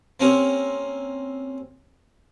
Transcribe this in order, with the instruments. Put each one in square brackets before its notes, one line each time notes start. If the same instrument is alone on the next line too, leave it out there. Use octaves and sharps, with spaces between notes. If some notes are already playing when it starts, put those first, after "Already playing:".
[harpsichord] A#3 C4 C#4 G4